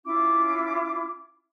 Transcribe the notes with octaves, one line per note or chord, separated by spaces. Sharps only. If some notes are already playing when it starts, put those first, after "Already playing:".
C#4 E4 F4 D6